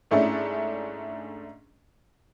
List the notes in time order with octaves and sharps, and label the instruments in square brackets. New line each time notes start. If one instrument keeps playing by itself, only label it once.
[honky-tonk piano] G#2 A3 C#4 D4 E4